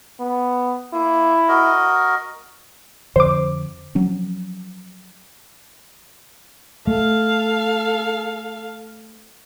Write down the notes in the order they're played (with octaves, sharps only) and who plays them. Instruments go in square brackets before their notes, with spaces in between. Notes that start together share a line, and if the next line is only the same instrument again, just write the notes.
[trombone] B3
[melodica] A#3 [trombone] E4
[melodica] F#4 A#4 D#5
[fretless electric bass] F2 D3 F3 [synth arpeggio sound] C5 D6
[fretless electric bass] F3 F#3 C#4
[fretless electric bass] A3 [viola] A4 F5